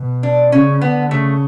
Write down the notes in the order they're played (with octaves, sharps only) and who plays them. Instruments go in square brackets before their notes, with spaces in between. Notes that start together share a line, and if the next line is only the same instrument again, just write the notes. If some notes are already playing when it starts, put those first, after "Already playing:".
Already playing: [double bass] B2
[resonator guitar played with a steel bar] D4
[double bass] C#3 [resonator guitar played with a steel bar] C#4
[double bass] D3 [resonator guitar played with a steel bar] B3
[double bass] C#3 [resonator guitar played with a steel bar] A3